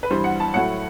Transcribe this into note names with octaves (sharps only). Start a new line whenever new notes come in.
B4
G2 E3 G3 C5
F#5
A5
A2 F#3 A3 F#5